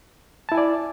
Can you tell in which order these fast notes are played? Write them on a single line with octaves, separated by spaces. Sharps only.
A5 E4 G#5 D5